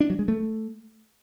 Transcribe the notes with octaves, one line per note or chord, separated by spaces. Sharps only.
D4
F#3
G#3
A3